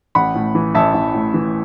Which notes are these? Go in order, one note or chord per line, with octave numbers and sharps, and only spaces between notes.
A1 F#5 B5
A2
E3
A1 E5 A5
A1
A2
E3